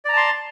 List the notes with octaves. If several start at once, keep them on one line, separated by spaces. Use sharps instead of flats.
D5 A5 A#5 C6